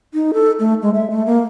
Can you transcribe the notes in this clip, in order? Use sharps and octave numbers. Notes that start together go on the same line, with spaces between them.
D#4
A4
A3
G#3
E5
A3
A#3